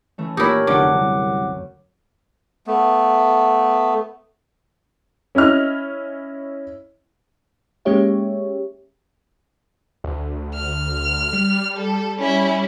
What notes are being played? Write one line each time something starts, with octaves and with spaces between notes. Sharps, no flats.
E3 A3 C#4
A#2 D#4 E4 G4 A#4 C#5
F1 F#2 D3 F#5 D6
C2
A3 B3
C#4 E4 D#5 F6
G#3 A#3 C#4 G4 C#5 E5
D2
F6
G3
A4
C#4 E4